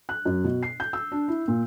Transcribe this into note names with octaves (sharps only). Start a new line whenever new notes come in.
F#6
F#2
B2
C7
G6
E6
D4
E4
A#2